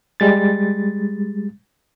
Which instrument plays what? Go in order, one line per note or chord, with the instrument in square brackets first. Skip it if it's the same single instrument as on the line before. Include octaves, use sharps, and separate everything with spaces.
[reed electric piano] G3 G#3 A6